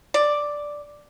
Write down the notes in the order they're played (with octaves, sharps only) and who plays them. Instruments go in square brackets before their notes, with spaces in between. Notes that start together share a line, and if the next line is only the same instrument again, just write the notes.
[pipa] D5